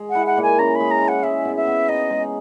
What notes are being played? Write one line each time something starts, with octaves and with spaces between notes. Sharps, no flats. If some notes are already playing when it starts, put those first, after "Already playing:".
Already playing: G#3
F#5
E4
F#5
A#2 G#5
C#4 A#5
B5
G#3
A#5
E4
F#5
G#3 E5
B2
E5
B2
D#4 D#5
G#3